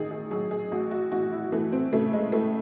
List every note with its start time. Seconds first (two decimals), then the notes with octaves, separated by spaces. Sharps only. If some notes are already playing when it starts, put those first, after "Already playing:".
Already playing: A1 D#3 G#4
0.11 G#4
0.31 F#3 G#4
0.51 G#4
0.71 A1 F#4
0.91 F#4
1.12 E3 F#4
1.32 E4
1.52 E3 A3
1.72 C4
1.93 C#3 A3
2.13 G#3
2.32 A2 A3